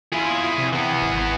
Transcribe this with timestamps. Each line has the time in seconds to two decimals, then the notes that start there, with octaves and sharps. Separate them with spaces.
0.12 E4 F4 G#4
0.58 C3
0.73 E3 B3
1.02 G#1